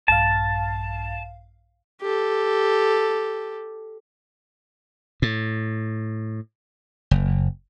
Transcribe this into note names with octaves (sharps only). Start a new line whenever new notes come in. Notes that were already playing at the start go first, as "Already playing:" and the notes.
A#1 G2 F5 A5
G4 A4
A2
F#1